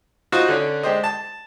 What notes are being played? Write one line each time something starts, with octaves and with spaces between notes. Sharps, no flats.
D#4 F4 F#4 C5 F5
D3 C#4 D4
G#3 D4 G4 C5 D#5
A5